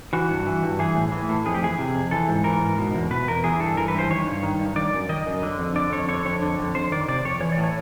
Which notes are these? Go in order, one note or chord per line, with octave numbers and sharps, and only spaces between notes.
E3 F#4
G2
E3
G2
E3 G#4
A2
E3
A2
F2 G#4
G4
E3 G#4
C3
F2
E3 A4
G#2
E3 A#4
G#2
B2
E2
B2 B4
E2 A#4
E3 G#4
G2 A4
E3 A#4
B4
G2 C5
D#3 C#5
G2
D#3
G2
D#3 D5
F#2
D#3 D#5
F#2
D3
F2
D3 D5
F2 C#5
D3 C#5
F2 C#5
D3
F2
F2 C5
D#3 D5
C3 D5
F2 C#5
E3 C#5
D5
A2
C#5